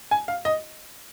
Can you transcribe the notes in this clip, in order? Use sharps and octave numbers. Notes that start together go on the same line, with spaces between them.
G#5
F5
D#5